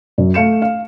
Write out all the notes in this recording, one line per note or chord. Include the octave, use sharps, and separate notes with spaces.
F#2
A3 F5 C#7 E7
F5